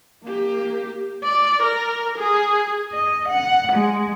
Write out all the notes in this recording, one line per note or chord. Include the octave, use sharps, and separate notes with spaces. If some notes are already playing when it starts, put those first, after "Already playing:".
A#3 G4
D5
A#4
G#4
D#5
F#5
G#3